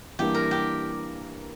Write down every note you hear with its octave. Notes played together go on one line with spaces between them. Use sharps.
E3 G3 A#3 D4 G4
A#4
G4